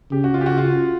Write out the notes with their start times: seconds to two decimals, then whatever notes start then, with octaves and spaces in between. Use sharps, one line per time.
0.12 C#3 G4
0.24 F#4
0.34 F4
0.41 G4
0.46 F#4
0.58 F4